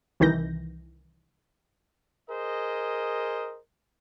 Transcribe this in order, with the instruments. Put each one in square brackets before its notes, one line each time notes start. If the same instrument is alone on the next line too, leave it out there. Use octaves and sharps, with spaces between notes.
[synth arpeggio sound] C2 D#3 E3 G6 A#6
[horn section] G#4 A#4 C5 D#5